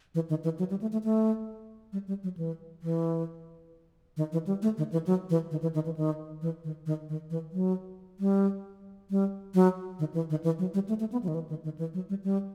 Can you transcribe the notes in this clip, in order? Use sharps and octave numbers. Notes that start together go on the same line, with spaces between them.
E3
D#3
E3
F#3
G3
A3
A3
A3
G3
G3
F#3
E3
E3
D#3
E3
G3
A3
D#3
E3
F#3
E3
D#3
E3
D#3
E3
D#3
E3
D#3
D#3
D#3
E3
F#3
G3
G3
F#3
D#3
E3
D#3
E3
F#3
G3
A3
A3
B3
F#3
D#3
E3
D#3
D#3
E3
F#3
G3
G3